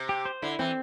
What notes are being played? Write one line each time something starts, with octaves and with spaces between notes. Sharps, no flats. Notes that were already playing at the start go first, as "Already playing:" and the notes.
Already playing: C3
G4
C5
D3 E4
E3 C4